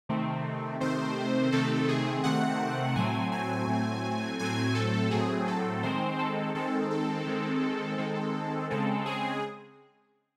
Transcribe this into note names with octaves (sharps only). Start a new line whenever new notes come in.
C3 D#3 A3 C4
C3 D#3 A3 C4 C5
C3 D#3 A3 C4 A4
G#4
C3 D#3 A3 C4 F#5
A2 F#3 A3 C4 G#5
G#5
A2 F#3 A3 C4
A2 F#3 A3 C4 G#5
A4
A2 F#3 A3 C4 G#4
A4
D#3 G#3 C4 C5
A4
D#3 G#3 C4 A4
A4
D#3 G#3 C4
D#3 G#3 C4
C#3 G#3 C4 A4
G#4